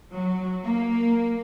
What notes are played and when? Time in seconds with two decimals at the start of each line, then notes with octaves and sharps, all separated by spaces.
0.14 F#3
0.64 A#3